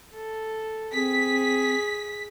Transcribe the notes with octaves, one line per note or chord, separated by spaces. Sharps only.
A4
C4 G#4 B6